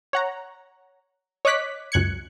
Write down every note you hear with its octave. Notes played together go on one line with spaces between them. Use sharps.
C#5 F#5 A#5
C#5 D#5 D6 F#6 B6
C#2 F#2 F#6 G#6 C#7